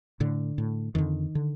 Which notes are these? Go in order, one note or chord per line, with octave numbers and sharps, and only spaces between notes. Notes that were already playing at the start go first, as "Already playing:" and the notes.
A2 D3
A2
F2 D3 D#3
D3